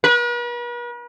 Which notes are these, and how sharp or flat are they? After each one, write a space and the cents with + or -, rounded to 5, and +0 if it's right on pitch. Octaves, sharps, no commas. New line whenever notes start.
B4 -45